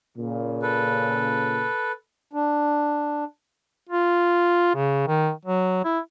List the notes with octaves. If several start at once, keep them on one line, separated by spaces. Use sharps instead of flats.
A#2 C#3
A4 B4
D4
F4
C#3
D#3
F#3
E4